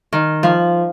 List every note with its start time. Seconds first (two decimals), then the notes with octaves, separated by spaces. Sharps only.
0.12 D#3
0.43 F3